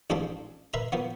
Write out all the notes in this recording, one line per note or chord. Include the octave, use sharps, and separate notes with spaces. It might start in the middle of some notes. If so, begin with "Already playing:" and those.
A1 G#2 F3 D4 A4 C6
A#4 B4 E5 C6
F3 A#3 B3